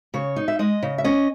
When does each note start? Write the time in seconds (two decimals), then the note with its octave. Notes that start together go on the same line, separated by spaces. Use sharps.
0.14 C#3 C#5
0.36 D#4
0.48 E5
0.59 G#3 D#5
0.83 C#3
0.98 E5
1.04 C#4 D#5